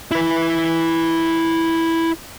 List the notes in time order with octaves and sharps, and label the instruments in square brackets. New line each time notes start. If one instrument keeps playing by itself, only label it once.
[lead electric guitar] E4 B4